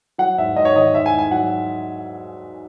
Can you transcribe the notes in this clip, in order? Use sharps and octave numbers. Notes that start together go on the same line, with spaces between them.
F#3 F#5
G#2 E5
G#2 D#5
C#5
D#3 D#5
G#2 E5
G#5
G#2
G#5
F#3 F#5